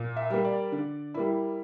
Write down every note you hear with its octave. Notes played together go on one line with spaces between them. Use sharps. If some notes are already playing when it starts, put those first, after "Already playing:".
Already playing: A#2
E5
G3 A#3
D5
D3
G3 A#3 E4